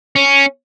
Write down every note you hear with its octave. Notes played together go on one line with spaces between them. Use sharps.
C#4